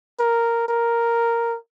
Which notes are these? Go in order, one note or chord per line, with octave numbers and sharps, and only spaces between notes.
A#4
A#4